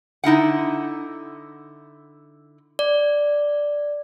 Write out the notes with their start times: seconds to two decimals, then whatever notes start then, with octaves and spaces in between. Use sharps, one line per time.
0.24 D3 D#4 E4 F#5
2.79 D5